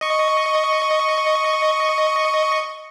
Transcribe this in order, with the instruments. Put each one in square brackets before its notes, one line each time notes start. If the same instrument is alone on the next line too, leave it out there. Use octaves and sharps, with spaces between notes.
[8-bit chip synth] D#5 C#6